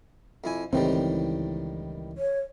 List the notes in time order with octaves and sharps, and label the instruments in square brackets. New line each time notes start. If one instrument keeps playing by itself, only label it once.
[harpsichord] F2 E4 G#5
[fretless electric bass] C#2 E3 C4 [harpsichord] A2 D#3 G3
[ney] C#5